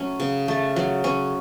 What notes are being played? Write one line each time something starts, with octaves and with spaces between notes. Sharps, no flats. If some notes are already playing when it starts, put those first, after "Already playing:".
Already playing: F#3 A3 C#4
C#3
A3
F#3
C#4